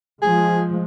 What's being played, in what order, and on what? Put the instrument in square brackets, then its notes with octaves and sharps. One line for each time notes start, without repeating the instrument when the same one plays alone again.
[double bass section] F3 G#3 [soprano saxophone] G#4